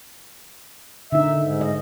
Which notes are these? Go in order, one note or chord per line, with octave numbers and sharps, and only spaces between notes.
D3 D#4 E5
G#2
D#5